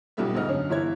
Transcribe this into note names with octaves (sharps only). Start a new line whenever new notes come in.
B1 A#2 G3 A3 B3 E5
D2 G#2 D#5 F6
F#2 D3 C#4
G1 E3 E4 C#5 G#6